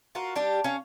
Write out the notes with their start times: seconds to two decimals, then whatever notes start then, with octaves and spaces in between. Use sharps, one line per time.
0.15 F4 F#4 A#4
0.36 G3 D4 G4
0.64 C#4 F5